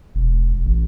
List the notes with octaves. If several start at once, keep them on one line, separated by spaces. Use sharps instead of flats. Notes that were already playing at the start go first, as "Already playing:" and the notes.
E1
A1